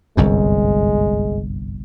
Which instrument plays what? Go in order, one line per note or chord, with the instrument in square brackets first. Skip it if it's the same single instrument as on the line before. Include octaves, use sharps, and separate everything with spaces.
[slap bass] G1 C2 F#2 [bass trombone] G#3